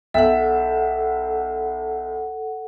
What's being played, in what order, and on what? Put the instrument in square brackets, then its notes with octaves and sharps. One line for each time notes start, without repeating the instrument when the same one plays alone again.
[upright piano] B1 E5 G5 [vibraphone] A4 F#5